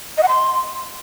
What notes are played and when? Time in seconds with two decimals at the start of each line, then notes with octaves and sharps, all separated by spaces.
0.18 D#5
0.23 F#5
0.28 C6